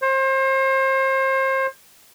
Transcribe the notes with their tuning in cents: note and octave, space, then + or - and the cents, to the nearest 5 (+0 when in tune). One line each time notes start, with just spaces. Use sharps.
C5 +35